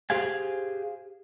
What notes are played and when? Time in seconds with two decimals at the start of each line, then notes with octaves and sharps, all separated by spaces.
0.10 G4 G#4 C5 F5 G#5